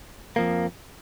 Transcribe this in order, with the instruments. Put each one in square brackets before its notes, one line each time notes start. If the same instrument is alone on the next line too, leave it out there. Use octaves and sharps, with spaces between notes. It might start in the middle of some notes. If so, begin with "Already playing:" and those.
[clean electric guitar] F2 F3 A#3